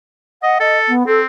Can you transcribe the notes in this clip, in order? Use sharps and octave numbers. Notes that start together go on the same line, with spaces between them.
D#5 F#5
A4 D#5
B3
C4 A4